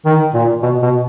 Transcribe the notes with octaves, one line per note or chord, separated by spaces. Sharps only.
D#3
A#2
B2
B2